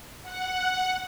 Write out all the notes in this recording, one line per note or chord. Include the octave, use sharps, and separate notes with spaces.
F#5